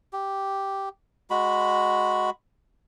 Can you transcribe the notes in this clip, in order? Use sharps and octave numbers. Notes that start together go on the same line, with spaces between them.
G4
G#3 F#4 B5